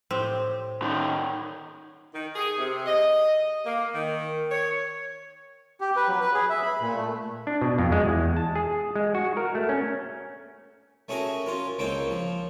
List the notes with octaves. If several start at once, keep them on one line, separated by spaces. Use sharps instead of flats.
A2 C4 G4
D#3 C#4
D#3
G#4
C3
D#5
A#3
D#3
C#5
G4
B4
F#3
B4
G#4
E5
B5
A#2
A3
D4
B2
F2
G#3
E2
A5
G#4
G#3
F#4
A#4
A3
C#4
A3 C#4 F#4 G#4 A#4
C#4 F4 A#4
C#2 A#3 C4 C#4 G5
F3